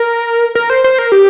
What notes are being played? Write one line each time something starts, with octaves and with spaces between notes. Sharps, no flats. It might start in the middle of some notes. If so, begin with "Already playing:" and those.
Already playing: A#4
A#4
C5
C5
A#4
G4